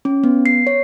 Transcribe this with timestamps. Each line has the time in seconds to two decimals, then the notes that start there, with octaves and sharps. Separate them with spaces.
0.05 C#4
0.24 B3
0.46 C7
0.67 C#5